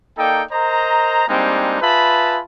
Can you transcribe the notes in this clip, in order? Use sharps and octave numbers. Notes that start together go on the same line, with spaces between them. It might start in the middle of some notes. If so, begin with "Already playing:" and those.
A#3 D#4 A4 D5 G5
A#4 C5 D#5 A#5
G3 G#3 A#3 C4 D4 D#4
F4 G#4 B4 E5 A5 B5